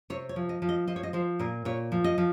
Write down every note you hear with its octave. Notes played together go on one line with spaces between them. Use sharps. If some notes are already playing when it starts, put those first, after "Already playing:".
C3 C#5
C#5
F3
D#5
F3
D#5
F3 D#5
C#5
D#5
F3 C5
A#2 A#4
A#2 C#5
F3
D#5
F3